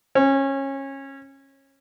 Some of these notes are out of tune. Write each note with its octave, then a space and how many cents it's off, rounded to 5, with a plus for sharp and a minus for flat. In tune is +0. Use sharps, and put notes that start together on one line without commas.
C#4 -25